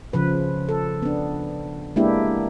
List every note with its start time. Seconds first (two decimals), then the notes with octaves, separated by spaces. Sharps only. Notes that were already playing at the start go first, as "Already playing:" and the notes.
0.13 C#3 F3 B4
0.69 A4
1.02 B3 D4
1.96 G#3 A#3 B3 D4 E4 G4